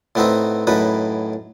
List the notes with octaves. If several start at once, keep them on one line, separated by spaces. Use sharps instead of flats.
A2 B3 C4 D#4
F#2 A2 D#4 B4